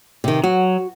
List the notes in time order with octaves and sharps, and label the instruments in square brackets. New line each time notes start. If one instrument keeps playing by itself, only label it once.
[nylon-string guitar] C3 D#3
[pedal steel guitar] F#3 [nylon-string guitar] F#4